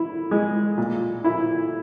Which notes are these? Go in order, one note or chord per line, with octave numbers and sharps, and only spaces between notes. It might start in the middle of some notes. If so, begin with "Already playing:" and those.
Already playing: E4
G#3
A#2
E4